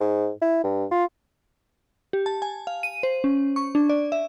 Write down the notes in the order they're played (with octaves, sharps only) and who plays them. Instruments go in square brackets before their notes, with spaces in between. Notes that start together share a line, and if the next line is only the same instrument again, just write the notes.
[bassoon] G#2
E4
G2
F4
[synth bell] G4
A5
G#5
F5
D#7
C5
C#4
C#6
D4
D5
E5